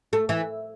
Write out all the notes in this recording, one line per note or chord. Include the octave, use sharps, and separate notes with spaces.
A3
E3